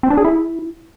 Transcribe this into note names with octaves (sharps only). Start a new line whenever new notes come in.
C4
D4
G#4
E4